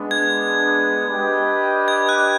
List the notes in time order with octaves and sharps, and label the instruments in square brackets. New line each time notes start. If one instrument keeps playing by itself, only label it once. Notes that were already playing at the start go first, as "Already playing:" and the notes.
Already playing: [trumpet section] G#3 B3 D4
[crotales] G#6
[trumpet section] D4 G4 B4 D#5 G5
[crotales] G#6
F#6